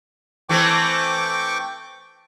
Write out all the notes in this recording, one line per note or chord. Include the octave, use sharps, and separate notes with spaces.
E3 A3 C4 G5 C#6 D6